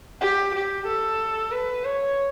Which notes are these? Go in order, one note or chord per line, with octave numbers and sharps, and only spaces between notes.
G4
G4
A4
B4
C#5